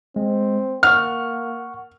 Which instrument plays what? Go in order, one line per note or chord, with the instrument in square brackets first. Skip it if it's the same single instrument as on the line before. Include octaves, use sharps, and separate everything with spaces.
[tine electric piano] G#3 [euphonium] C4
[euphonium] A#3 [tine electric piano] F#5 C#6 [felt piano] F6